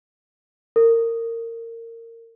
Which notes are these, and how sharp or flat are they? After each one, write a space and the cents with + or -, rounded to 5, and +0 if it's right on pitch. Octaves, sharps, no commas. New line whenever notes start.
A#4 -25